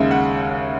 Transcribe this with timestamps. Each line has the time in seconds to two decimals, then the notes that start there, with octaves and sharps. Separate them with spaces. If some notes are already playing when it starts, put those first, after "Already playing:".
Already playing: D#2 C#3 G#3 E5
0.11 F#5